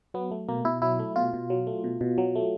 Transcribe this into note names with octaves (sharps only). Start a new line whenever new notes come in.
F#3 B3
A3
B2 A#3
B2 E4
F#3 E4
A3
B2 F4
B2
F#3
A3
B2
B2
F#3
A3